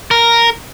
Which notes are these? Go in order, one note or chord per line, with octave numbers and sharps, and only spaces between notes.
A#4